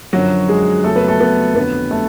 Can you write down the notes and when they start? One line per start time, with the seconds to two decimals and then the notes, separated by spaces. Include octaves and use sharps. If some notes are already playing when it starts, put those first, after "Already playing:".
0.13 F#2 D3 F3 F#3 F#4
0.49 G#3 G#4
0.84 F2 C#3 F#3 A3 A4
0.96 B3 B4
1.08 A3 A4
1.20 B3 B4
1.55 F2 D3 F#3 B3 B4
1.91 A3 A4